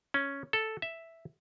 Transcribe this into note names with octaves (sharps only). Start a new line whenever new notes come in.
C#4
A4
E5